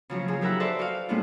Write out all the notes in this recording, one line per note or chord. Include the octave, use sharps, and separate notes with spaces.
C#3 F3 F#3 C#4
F3 F#3 G#4
D#4 G4 A#4 E5 F#5 B5
A4 B4 C5 D5 E5
F#4 G4 F5
A2 G3 G#3 B3 D4 F4